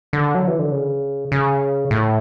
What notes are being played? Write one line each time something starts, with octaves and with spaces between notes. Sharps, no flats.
D3
F#3
E3
D3
C#3
C#3
A2